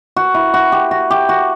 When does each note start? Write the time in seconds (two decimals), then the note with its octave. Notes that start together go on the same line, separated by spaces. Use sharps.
0.16 F#4
0.34 E4
0.54 F#4
0.72 G4
0.91 F#4
1.11 G4
1.29 F#4